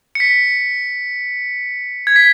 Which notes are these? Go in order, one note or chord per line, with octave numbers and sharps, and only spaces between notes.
C#7
B6
G#6
B6